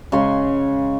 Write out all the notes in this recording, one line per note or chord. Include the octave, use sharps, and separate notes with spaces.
C#3 G#3 C#5 C6